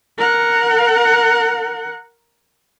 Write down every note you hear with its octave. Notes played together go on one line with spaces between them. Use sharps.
A#4 F#5